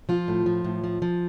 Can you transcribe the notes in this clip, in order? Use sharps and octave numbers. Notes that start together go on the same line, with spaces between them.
F3 F4
A2
F3
A2
F3
F3